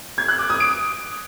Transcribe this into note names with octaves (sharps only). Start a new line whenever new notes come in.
G#6
F#6
D6
D#6
D7